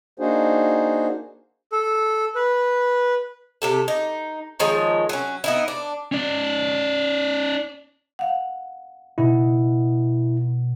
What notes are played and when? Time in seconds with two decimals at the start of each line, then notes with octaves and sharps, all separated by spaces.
0.19 A#3 D4 D#4 F#4 G#4 C5
1.72 A4
2.35 B4
3.62 C3 G4 A4
3.88 D#4
4.59 D#3 F3 G#3 C#5
5.09 F#3 C#4
5.44 B3 D#4 E4
5.68 D4
6.12 C#4 D5
8.19 F5 F#5
9.18 B2 E4